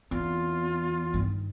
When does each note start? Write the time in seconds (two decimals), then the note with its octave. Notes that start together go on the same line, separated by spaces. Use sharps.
0.11 E2 C4 F4
1.14 G2 D#3